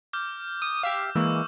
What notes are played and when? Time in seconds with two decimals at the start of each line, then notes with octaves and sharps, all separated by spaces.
0.13 D6 F6 G6
0.62 D#6
0.83 G4 E5 F5 D6
1.15 E3 G#3 A#3 C#6 E6